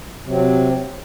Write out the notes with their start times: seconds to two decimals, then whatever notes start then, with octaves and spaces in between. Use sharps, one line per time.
0.24 C3
0.27 F#3
0.30 C4